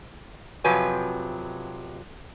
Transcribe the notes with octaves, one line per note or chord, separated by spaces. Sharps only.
F2 C3 F3 F#3 B4 G#5